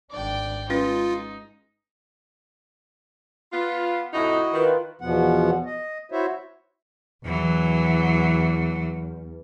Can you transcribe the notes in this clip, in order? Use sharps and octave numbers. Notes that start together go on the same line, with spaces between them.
G#1 D4 D5 G5
G#3 C#4 D#4 F4 B4
B3 F4
F2 A2 D#4 E4 F#4 D#5
D#3 F4 B4
E2 B2 F3 B3 F#5
D#5
E4 F#4 C5 C#5 E5
E2 E3 F#3